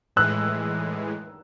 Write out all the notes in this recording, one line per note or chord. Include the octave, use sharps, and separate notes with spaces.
A2 E3 G#3 E6 F#6